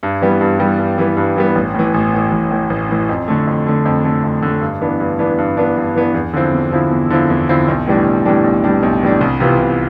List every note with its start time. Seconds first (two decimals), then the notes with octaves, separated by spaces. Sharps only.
0.03 G2
0.22 E3 G3 B3
0.41 G2
0.59 E3 G3 B3
0.79 G2
0.98 E3 G3 B3
1.17 G2
1.36 E3 G3 B3
1.55 A1
1.74 A2 E3
1.94 A1
2.13 A2 E3
2.32 A1
2.51 A2 E3
2.70 A1
2.89 A2 E3
3.09 F2
3.28 D3 A3
3.47 F2
3.66 D3 A3
3.85 F2
4.04 D3 A3
4.23 F2
4.42 D3 A3
4.61 G2
4.81 E3 B3 D4
5.00 G2
5.19 E3 B3 D4
5.38 G2
5.57 E3 B3 D4
5.77 G2
5.96 E3 B3 D4
6.14 E2
6.33 D3 F3 C4 E4
6.53 E2
6.72 D3 F3 C4 E4
6.91 E2
7.10 D3 F3 C4 E4
7.30 E2
7.49 D3 F3 C4 E4
7.68 B1
7.87 A2 E3 G3 D4
8.06 B1
8.25 A2 E3 G3 D4
8.44 B1
8.64 A2 E3 G3 D4
8.83 B1
9.02 A2 E3 G3 D4
9.21 C2
9.40 C3 E3 B3 F4
9.59 C2